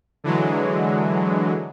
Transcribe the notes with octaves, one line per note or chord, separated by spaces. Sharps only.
D3 E3 F#3 G#3